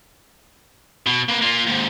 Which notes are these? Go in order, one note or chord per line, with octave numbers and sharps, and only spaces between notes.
B2
A#3 B4
A#3 F4
D#2 G#2